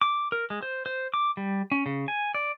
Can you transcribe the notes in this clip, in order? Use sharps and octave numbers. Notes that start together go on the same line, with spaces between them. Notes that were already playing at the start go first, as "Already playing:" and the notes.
D6
A#4
G#3
C5
C5
D6
G3
C#4
C#3
G#5
D5